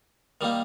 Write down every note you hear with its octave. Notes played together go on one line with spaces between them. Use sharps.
D#3 G3 A#3